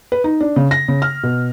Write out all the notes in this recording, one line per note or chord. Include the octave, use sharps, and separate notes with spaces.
B4
D#4
D4
C#3
A#6
C#3
F6
B2